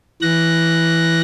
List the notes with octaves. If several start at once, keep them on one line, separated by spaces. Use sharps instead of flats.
E3 F#6 A#6